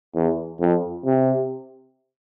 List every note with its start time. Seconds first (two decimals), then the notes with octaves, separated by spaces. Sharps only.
0.15 E2
0.61 F2
1.05 C3